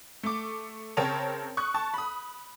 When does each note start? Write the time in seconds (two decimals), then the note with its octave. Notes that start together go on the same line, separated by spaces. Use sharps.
0.23 A3 D6
0.97 C#3 C4 A#4 C#5 A5 F7
1.57 C#6 D#6 F#6
1.74 A5 C#6
1.94 B5 D#6